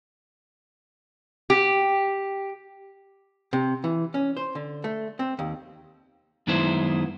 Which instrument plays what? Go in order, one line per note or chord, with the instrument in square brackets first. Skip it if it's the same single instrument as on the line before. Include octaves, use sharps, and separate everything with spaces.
[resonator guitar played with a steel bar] G4
[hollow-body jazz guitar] C3
E3
C#4
C5
D3
A3
C4
D#2
[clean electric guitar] F#2 D#3 G#3 B3 E4 C5